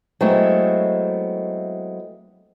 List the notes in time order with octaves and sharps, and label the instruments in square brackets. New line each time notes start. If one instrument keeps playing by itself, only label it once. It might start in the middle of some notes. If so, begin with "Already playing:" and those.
[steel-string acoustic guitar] F#3 G#3 A3 B3 C4 E4